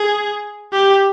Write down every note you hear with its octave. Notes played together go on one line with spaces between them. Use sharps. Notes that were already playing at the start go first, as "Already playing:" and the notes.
Already playing: G#4
G4